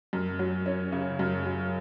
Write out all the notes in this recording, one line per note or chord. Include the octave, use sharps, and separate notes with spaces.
F#2
F#3
C#4
C#3
F#2
F#3